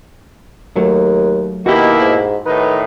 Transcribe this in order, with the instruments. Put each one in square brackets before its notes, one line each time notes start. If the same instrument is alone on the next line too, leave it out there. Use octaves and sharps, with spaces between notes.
[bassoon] D#2 [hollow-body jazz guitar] F#3 A3
[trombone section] B2 A#3 E4 [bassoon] D#3 [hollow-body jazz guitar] F#4 G4
[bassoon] G#2
[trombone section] A2 D#3 D#4 [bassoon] B4